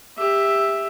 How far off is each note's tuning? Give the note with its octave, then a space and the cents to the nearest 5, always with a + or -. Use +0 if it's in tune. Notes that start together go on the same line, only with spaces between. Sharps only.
G4 +25 E5 +0